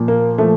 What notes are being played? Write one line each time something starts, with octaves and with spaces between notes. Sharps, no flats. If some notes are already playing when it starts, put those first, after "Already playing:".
Already playing: A#2 F3
A#3
F3 A3